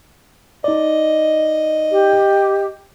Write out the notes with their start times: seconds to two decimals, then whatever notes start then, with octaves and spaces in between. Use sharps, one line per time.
0.64 D#4 D5 D#5
1.91 G4